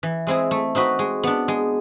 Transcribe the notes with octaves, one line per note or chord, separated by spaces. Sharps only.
E3
G#3 C4 E4 G#4
A3
C4 D#4 F#4 B4
G#3
B3 D4
G#3